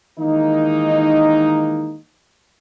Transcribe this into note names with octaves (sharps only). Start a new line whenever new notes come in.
D#3 E3 G#3 A#3 D#4